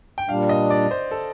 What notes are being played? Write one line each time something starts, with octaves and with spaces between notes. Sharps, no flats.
G5
A#2 G3 D4 F5
D#5
D5
C5
A4